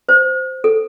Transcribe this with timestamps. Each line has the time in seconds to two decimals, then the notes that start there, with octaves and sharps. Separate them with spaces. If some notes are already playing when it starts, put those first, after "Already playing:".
0.09 C5
0.64 A4